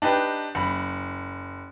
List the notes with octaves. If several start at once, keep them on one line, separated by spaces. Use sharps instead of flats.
D4 D#4 G4 B4
F#1 B5